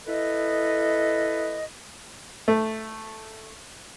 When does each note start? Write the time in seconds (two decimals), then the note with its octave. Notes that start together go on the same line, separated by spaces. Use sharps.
0.07 E4 A4 B4 D#5
2.48 A3